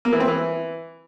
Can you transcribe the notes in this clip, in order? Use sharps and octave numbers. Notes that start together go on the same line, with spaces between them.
A#3
E3
C4
E3